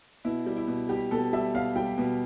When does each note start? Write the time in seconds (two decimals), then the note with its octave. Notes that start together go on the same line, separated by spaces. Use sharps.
0.25 B2 E4
0.46 G3
0.57 E4
0.68 B2
0.89 G3 G4
1.11 B2 A4
1.33 G3 E5
1.54 B2 F5
1.76 G3 G5
1.98 B2